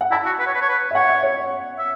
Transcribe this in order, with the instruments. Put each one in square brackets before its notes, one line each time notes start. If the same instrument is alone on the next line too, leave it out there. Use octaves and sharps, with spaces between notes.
[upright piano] F#5
[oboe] E4 [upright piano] A5
[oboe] F#4
B4
C#5
B4
C#5
B4
[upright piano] E5
[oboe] C#5 [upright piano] F#5
[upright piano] E5
C#5
[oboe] E5